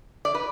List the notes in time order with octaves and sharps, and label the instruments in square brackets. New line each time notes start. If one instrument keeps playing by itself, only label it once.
[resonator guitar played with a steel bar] D5
B4